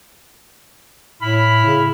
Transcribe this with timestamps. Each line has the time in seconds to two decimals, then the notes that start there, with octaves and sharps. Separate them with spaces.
1.22 A2 E4 B5 F6
1.65 C#3